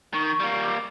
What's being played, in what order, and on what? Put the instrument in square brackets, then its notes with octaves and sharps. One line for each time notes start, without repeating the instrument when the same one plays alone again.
[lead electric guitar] D#3 [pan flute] C#6
[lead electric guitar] G3 A#3
[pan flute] D6